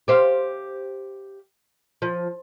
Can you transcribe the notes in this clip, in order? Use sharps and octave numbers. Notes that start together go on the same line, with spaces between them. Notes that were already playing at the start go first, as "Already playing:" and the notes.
G4 C5 F5
F3